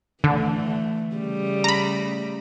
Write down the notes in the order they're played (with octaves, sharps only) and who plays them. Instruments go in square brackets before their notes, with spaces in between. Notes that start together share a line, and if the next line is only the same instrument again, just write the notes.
[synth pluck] D3 [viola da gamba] E3 A3
[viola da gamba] C#3 G3 A3
[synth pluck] A#5 B5